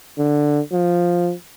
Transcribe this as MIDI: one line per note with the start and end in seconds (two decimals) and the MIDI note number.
0.18 0.60 50
0.72 1.32 53